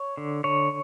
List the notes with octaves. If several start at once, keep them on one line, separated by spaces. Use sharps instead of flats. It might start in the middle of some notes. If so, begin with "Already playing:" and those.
Already playing: C#5
D3
D3 C#5